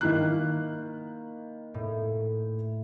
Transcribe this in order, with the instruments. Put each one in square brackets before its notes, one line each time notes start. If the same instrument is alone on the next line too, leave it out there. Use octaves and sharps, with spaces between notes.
[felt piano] D#3 E4 F#6 [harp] A#3
[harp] A2